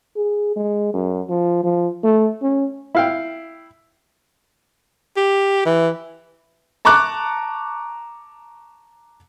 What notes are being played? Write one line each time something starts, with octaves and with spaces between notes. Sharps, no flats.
G#4
G#3
F#2
F3
F3
A3
C#4
E4 F5 G5
G4
E3
A5 A#5 C#6 D6 F#6